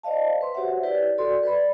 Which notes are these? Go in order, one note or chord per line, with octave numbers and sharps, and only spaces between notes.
C5 D5 D#5 F5 A5
B4 C6
F#4 G4 C5 C#5 E5 F#5
E4 G4 B4 C#5 D5
F#4 A4 D5 C6
B4 D5 B5